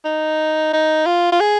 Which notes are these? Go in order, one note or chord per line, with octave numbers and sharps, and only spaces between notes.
D#4
D#4
F4
F4
G#4